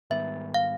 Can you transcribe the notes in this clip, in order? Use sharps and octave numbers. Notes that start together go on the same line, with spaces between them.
G#2 D#3 G3 B3 E5
F5